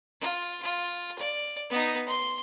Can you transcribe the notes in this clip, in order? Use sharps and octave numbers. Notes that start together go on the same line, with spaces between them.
F4
F4
D5
B3 D#4
C6